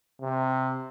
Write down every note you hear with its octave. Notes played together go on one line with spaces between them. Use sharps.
C3